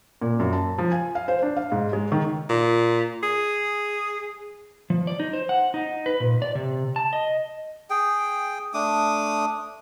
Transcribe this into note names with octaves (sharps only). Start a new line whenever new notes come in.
A#2
F#2
A5
F3
G#5
F5
C5
D4
F5
G#2
G#3
D#3
A#2
G#4
F3
D5
D#4
C5
F#5
D#4
B4
A#2
D5
C3
A5
D#5
G#4 G5
A3 D4 D6 D#6